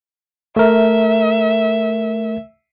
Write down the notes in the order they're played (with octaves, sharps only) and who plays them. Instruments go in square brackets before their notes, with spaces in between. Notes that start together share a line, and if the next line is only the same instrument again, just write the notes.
[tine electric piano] A3 A#4 [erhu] E5